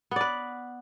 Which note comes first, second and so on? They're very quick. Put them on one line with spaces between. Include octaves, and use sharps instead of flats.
B3 D5 B4